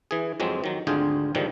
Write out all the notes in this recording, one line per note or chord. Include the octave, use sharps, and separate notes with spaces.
E3 G#4
F2 F#3 G#3 C4
D#3 F#3
G#1 D2 D3 F4 G#4 G5
G#2 D3 D#3 F3 G3